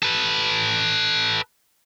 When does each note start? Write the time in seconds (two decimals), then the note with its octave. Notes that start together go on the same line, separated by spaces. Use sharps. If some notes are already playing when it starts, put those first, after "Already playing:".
0.03 A4 B4